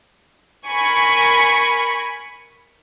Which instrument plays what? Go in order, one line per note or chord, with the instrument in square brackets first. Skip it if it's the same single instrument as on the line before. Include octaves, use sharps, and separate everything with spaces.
[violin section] A#4 G#5 B5 C#6